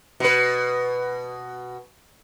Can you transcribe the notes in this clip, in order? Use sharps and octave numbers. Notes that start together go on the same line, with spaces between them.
B2 B4